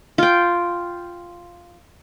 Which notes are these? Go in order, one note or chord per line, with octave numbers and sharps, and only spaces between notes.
F4 G5